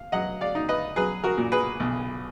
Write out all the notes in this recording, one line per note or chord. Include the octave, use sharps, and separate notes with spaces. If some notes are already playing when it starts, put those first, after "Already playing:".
Already playing: F5
F#3 D#5 F#5
D5 F5
D#4
B4 D#5
F#3 G#4 B4
F#4 A#4
A#2
G#4 B4
B1